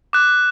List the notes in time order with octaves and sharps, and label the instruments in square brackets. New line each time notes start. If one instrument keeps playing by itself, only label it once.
[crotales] D6 F#6